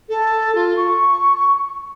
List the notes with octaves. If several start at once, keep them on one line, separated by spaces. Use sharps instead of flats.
A4
F4
C#6